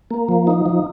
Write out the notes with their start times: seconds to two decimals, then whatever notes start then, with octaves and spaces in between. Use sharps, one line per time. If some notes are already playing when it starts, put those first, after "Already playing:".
0.11 A#3
0.29 F3
0.47 D#4
0.66 F3